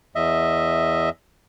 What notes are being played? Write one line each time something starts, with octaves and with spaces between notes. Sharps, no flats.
E2 D#5 E5